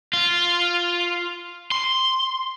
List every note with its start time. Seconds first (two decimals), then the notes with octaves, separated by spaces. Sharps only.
0.13 F4
1.72 C6